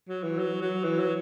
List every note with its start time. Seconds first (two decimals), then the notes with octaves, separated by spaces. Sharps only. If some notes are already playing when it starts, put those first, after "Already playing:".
0.08 F#3
0.23 E3
0.38 F#3
0.61 F#3
0.84 E3
0.99 F#3